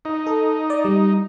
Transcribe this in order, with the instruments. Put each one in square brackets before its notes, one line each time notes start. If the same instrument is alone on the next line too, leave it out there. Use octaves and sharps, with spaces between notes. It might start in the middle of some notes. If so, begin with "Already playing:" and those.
[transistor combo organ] D#4
[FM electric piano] A4
D5
G3